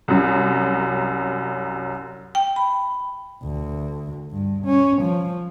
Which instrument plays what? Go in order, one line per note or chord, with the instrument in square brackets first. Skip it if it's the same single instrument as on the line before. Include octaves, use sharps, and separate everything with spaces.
[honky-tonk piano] C2 F#2
[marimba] G5
B5
[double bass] D2
G2
C#4
F3